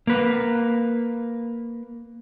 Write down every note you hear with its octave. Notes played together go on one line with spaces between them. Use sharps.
A#3 B4